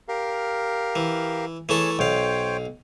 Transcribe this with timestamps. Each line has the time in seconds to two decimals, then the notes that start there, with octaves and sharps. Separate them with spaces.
0.08 G4 A#4 F5
0.96 E3
1.69 E3 A3 G#4 C#5 A5
1.99 B1 C5 C#5 F5 G5